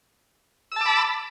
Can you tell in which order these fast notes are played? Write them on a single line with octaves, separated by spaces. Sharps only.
E6 A5 D6 B5